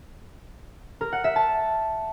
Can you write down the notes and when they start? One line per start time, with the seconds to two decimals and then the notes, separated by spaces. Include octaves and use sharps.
1.01 A#4
1.12 F#5
1.24 E5
1.36 A5